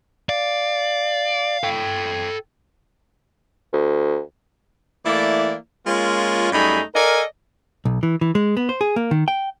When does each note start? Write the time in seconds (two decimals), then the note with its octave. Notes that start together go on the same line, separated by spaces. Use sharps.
0.29 D5 F5
1.63 A4 G5
3.73 D2
5.05 E3 A3 A#3 E4 D5
5.87 G#3 A#3 C#4 F4
6.52 F#2 G3 A3 D#4 G#4 B5
6.95 A4 A#4 D5 D#5 F5 G#5
7.85 B1
8.03 E3
8.21 E3
8.35 G#3
8.57 B3
8.69 C5
8.81 G#4
8.96 A#3
9.11 D#3
9.28 G5